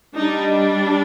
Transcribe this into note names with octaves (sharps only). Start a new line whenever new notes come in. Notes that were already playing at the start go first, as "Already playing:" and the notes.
G3 D4 D#4